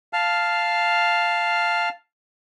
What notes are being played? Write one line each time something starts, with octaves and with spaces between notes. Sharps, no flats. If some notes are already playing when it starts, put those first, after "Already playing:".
F5 A5 F6